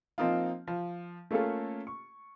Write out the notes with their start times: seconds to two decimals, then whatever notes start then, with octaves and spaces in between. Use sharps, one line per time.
0.18 F3 A#3 C4 D#4 F4
0.68 F3
1.31 A3 A#3 C#4 F4 A4
1.87 C#6